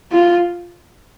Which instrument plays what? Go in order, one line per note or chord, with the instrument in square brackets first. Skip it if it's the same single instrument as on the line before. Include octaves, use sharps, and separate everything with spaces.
[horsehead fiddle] F4